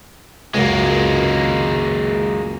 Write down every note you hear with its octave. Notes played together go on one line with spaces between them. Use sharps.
C#2 F#2 G#3 A#3